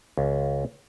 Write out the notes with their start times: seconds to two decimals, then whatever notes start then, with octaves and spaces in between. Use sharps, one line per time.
0.18 C#2